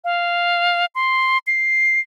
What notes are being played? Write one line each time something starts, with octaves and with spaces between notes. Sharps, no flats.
F5
C6
C7